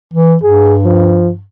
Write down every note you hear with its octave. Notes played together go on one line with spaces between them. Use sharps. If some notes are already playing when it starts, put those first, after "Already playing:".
E3
G2 G#4
F3